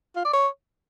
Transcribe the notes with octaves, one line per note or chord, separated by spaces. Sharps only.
F4
D5
C#5